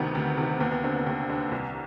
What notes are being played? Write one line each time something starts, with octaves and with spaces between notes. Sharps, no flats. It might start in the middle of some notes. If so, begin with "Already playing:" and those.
Already playing: D2 C3 D#3 B3
D2
C3 D#3
D#2 B3
B3
D3 C4
B3
D#2
D3
C2